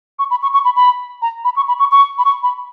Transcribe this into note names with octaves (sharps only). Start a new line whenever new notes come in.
C#6
B5
C#6
C#6
B5
B5
A#5
B5
C#6
B5
C#6
C#6
B5
C#6
B5